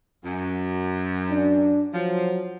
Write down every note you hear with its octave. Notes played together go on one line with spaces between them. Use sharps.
F#2
D4
F3 F#3